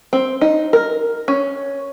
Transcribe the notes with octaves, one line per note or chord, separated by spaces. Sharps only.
C4
D#4
A#4
C#4